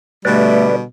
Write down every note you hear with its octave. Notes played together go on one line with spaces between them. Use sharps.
B2 D3 G3 A3 B4 D5